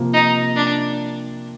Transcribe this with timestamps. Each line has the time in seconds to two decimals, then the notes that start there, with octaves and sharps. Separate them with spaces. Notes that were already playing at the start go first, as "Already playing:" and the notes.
Already playing: C3 F3 A#3
0.13 D#4
0.56 D4